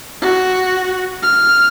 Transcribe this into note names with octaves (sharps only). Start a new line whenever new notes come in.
F#4
F6